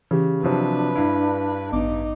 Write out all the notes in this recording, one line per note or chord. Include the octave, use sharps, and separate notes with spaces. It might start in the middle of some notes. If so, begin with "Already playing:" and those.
C#3 E3 G4
C3 F3 F#3 D4 B4
G2 E4 F5
A1 B3 D#4 D6